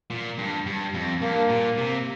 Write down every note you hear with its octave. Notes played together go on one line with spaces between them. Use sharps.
A#2
G2
G2
F2
G2 A#3
A#2
C3